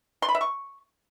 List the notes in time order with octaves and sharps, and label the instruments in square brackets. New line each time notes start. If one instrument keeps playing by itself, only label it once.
[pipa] C6
B5
E5
C#6